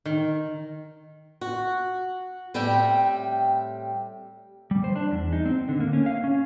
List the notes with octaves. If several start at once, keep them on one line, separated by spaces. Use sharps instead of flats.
D#3
F#4
A2 G3 C4 E5 G5
G3
C5
D4
E2
D#4
C4
D3
A#3
C#4
F5
C#4